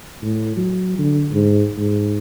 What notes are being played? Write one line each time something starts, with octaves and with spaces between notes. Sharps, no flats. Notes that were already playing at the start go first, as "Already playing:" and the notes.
A2
F#3
D3
G#2
G#2